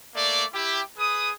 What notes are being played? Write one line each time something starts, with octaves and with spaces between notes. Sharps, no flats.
A3 A#3 D5
E4 G4
G#4 B4 D#6